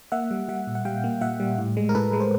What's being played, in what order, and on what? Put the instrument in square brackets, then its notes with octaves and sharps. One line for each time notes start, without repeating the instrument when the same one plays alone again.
[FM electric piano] A#3 E5 F#5
G3
G3 E5 F#5
A#2
F#5
G3 F5 G5
A#3
A#2 E5 F#5
G3
A2
G#3
A#4
A2 A4 B4
G#3
C5